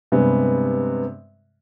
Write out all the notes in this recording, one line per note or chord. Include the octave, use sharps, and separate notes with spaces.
G2 C3 G#3 B3